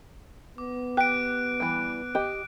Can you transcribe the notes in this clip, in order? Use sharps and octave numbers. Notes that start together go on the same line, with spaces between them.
B3 D6
G4 F#6 D7
E3 G3
G4 D#5